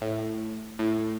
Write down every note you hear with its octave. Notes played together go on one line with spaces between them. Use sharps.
A2
A2